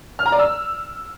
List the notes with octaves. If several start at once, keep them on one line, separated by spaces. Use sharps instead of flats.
F6
A#5
D5
E6